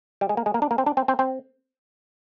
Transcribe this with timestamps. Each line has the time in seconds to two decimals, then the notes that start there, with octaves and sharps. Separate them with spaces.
0.21 G3
0.29 G#3
0.37 A#3
0.46 G#3
0.54 A#3
0.62 D4
0.71 A#3
0.78 C4
0.86 D4
0.97 C4
1.08 C4
1.19 C4